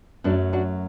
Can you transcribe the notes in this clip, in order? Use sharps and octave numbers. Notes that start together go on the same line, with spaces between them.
F#2 F#3 A3 B3 D4
D4 F#4